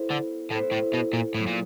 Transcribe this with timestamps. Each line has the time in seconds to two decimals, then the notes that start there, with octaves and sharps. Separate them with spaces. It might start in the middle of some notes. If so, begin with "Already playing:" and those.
Already playing: B3 E4 A4 C5
0.11 D3
0.51 A2 B3 E4 A4 C5
0.72 A2
0.94 B2
1.13 A#2
1.35 A2 F#3 B3 E4 G#4
1.47 A#2